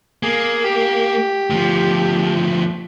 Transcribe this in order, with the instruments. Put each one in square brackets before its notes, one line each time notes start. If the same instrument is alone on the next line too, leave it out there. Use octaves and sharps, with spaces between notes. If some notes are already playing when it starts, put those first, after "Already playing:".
[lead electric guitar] A#3 [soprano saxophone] G#4
[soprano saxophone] G4
[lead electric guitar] D2 F3